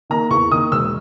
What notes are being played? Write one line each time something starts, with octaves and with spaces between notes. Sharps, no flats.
D#3 A#3 A#5
E2 C#6
D#3 A#3 D#6
E1 E6